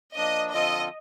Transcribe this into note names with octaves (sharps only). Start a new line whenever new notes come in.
F3 A#3 D4 D#5
D3 F3 C4 F4 A4 D#5